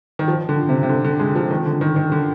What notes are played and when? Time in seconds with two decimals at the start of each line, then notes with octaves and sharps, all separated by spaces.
0.19 D#3
0.28 F3
0.49 D3
0.69 C3
0.83 C3
0.89 D3
1.04 D3
1.19 G#3
1.35 F3
1.50 D#3
1.66 D3
1.81 D#3
1.96 D#3
2.12 D3